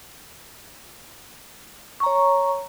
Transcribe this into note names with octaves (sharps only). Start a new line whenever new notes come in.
C#5 A#5 C#6